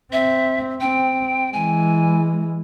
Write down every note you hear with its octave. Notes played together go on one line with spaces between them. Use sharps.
C4 E5
C4 G5
E3 G#3 G#5